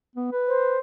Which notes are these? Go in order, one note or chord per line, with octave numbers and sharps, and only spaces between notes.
B3
B4
C5